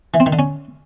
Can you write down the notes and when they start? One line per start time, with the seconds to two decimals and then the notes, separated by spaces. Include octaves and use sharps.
0.14 E3
0.20 C4
0.26 D#3
0.33 D3
0.39 C#4